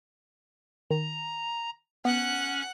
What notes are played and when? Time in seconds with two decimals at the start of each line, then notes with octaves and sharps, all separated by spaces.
0.91 D#3 A#5
2.05 B3 C#4 F#5 F#6